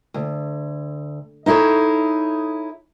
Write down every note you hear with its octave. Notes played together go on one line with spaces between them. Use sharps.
D2
D#4 E4 G#4 A4 C#5